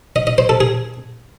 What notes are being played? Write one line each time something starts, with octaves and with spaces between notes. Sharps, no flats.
D#5
D#5
C5
A4
G#4